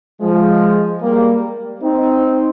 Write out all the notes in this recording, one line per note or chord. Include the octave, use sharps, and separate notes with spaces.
F3 G#3
G3 A#3
C4 D#4